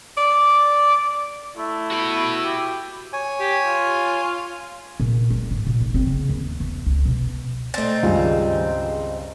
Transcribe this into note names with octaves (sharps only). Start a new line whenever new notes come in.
D5
A3 E4
F#4 B5
G4
C#5 G#5
G4
F4
A#2
G3
G#2
A#2
D#4
C4
C#3
D#2
E2
C#2
B2
A3 C4 D#4 A6
C#2 G2 D#3 F4 G#4 G#5